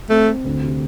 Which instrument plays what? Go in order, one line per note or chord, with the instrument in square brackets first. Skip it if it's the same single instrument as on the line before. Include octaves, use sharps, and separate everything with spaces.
[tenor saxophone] A3 [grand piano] C4
[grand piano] C4
D2
C3